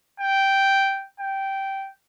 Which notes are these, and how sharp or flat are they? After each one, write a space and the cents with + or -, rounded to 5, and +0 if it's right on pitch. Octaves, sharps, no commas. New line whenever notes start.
G5 -5
G5 -10